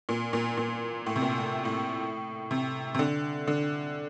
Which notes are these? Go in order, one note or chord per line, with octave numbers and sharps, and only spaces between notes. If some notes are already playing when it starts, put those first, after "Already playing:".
A#2
A#2
A#2
A2
C3
A#2
A2
A2
C3
C3
D3
D3